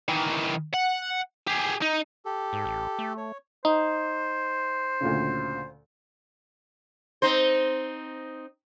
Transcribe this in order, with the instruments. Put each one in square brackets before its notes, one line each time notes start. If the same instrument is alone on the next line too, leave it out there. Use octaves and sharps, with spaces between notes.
[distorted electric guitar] D#3 E3
F#5
G4 G#4
D#4
[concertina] G4 A4
[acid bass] G#2
A1
A3
[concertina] C#5
[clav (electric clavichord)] D#4 [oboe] C5
[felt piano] D2 A#2 C#3
[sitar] C4 D#4 C5